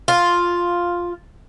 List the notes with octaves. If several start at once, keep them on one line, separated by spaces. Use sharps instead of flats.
F4